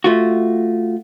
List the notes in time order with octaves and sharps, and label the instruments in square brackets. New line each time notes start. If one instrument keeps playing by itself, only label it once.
[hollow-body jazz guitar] A3 F4 F#4